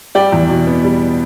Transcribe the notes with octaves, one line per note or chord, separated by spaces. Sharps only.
G3 D5 G5
E2
B2
B3
G3